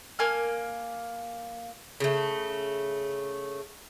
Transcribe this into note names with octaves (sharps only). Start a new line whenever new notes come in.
A#3 G#5 F6
C#3 A3